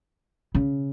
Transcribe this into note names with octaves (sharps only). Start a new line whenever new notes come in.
C#3